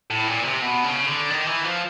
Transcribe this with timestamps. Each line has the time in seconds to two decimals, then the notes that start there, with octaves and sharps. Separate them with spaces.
0.11 A2
0.27 A#2
0.44 C3
0.62 B2
0.84 C#3
1.07 D3
1.30 D#3
1.47 E3
1.64 F3